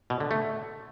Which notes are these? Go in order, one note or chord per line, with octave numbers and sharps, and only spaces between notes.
B2
D3
A3